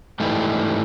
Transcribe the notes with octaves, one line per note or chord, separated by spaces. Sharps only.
G#2 E3 G3 A3